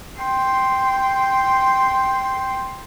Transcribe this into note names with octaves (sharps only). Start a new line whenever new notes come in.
G5 C6